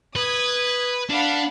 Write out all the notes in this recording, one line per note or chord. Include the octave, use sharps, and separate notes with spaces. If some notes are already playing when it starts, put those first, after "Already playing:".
B4 D#6 G#6
D4 F5 F#5 B5